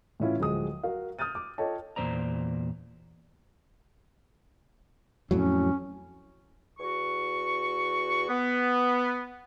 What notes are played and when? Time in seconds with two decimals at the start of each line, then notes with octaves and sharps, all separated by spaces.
0.20 A2 E3 C#4 E4 F4
0.39 D1 F3 G#3 D#6
0.83 F#4 A#4 F5
1.19 D#6 F6 G6 A6 D#7
1.35 D6
1.58 F4 A4 C#5 D#5 G5 A5
1.96 E2 A#2 F3 C5 D5 A#5
5.31 F2 A2 F#3 C#4
6.79 E2 F#4 C#6
8.29 B3